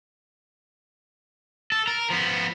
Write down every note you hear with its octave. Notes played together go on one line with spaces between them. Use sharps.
A4
A#4
F3 B3